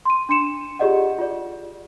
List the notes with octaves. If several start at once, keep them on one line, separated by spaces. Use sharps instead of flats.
C6 D#7
D4 C6 C#7 E7
F4 G4 G#4 D5 D#5 F#5
F4 D5